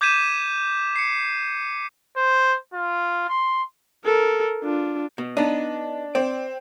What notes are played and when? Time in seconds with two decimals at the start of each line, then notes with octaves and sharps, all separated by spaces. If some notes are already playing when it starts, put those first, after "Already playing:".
0.01 D6 G6 G#6 B6 D#7 E7
0.96 C7 C#7
2.17 C5
2.74 F4
3.28 C6
4.05 A4 A#4
4.64 D4 F4
5.18 B2
5.37 B3 D4 D#4
6.15 C4 D5